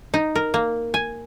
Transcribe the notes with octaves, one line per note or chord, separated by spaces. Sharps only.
D#4
A#4
A#3
G#5